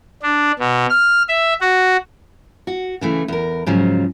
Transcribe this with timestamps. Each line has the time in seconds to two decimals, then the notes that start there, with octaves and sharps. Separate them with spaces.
0.23 D4
0.59 B2
0.90 F6
1.29 E5
1.61 F#4
2.67 F#4
3.01 C#3 E3 A3
3.28 E2 A#4
3.66 G#2 C#3 F3 F#3